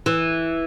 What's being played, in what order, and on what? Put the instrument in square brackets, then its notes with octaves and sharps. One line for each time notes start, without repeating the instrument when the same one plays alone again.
[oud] E3